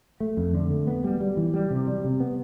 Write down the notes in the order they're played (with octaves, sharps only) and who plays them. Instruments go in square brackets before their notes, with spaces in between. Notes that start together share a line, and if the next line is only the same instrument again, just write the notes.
[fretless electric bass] A3
F2
D3
A3
B3
G3
G3
E3
G3
C3
G3
C3
B3